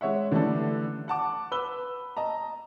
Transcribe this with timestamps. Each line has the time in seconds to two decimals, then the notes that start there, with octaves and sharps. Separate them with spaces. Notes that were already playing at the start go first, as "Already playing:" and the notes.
0.01 G#3 C#5 E5 F#5
0.32 D3 E3 G3 A3 D4 A4
1.08 F#5 A5 D6
1.51 B4 E6 G7
2.17 D#5 A5 A#5